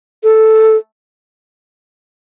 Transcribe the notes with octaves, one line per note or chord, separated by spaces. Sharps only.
A4